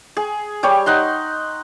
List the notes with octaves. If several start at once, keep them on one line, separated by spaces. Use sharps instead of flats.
G#4
G3 G4 C#5
D#4 F#5 C6